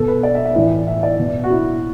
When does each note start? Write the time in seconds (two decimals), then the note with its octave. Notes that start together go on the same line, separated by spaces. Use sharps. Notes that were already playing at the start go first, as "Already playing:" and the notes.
Already playing: B2 A4
0.08 B4
0.23 D5
0.35 E5
0.45 E5
0.55 A2 E3 D5
0.88 E5
1.03 D5
1.19 B2
1.44 F#4
1.50 E4